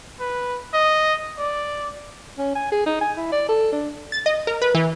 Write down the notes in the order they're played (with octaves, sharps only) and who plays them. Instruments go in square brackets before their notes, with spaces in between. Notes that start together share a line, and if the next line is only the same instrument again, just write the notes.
[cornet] B4
D#5
D5
[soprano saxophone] C#4
G#5
G#4
D#4
G#5
E4
D5
A4
D4
[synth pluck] A6
D#5
A#4
B4
E3